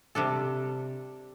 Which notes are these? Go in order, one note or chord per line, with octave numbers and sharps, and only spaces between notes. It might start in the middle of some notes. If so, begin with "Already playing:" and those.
C3 G3 D4 A4